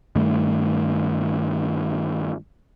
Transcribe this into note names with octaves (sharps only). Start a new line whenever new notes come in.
G2 D#3 A3